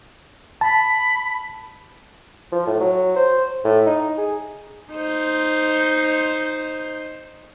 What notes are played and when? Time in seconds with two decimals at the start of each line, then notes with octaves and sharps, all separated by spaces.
0.61 A5 B5
2.52 F3
2.66 A2
2.80 F#3
3.16 C5
3.64 A2
3.86 D#4
4.17 G#4
4.92 D#4 C5